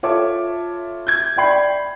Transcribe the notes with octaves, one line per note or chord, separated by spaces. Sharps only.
F4 A4 C#5 E5 A5 D6
G6 G#6
D5 E5 G5 B5 C7